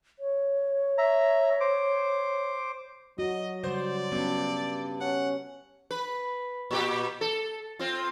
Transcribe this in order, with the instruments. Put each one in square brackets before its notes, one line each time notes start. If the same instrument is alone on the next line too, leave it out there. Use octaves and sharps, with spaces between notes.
[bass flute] C#5
[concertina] E5 A#5
C5 D6
[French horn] F#3 [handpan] F#4 [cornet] D#5
[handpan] C#3 G3 [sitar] C5 [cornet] D5
[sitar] G2 [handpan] B3 C#4
[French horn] C#4 [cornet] F#5
[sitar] B4
A#2 G4 B4
A4
C4 F4